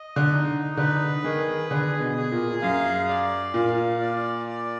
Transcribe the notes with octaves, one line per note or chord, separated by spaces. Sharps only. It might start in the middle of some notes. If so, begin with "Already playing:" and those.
Already playing: D#5
D3
D#4
D3 B4
D#3 G#4
D3 G#4
B2
G#4
A#2
F#2 F5
D5
A#2 F5
D5
D5